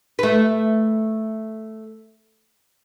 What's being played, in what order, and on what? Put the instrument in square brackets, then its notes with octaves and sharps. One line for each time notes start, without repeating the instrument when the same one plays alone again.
[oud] A3 B4